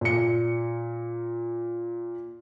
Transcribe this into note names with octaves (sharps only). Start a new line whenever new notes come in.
A#2 C#7